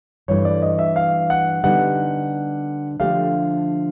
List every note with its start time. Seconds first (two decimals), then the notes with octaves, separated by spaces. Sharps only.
0.28 G2 E3 A3 C#5
0.45 D5
0.62 D#5
0.79 E5
0.96 F5
1.30 F#5
1.64 D3 G3 B3 D#4 F#5
3.00 D3 F3 A3 D4 G4 F5